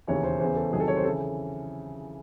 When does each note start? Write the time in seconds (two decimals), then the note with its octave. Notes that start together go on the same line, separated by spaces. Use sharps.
0.07 E1 D#2 C#3 E3 C#5
0.24 C5
0.40 E2 C#3 E3 C5
0.56 A4
0.72 C2 C3 D#3 F#3 G#4
0.80 A4
0.88 C#5
0.97 C5
1.04 A4
1.07 C#3 E3